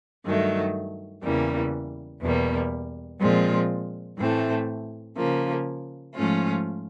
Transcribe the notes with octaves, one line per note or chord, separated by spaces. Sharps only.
G2 D#3 F#3 A3
E2 C#3 E3 G3 A#3
E2 B2 G3 A#3
A#2 F3 G#3 C4 F4
A2 E3 A3 C4
C#3 F3 A#3
G#2 F3 A3 C#4 F4